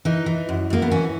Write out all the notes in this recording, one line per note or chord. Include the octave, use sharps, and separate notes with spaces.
E3 D#4
E3
F#2
F#2 A#3
B3
E3 C#4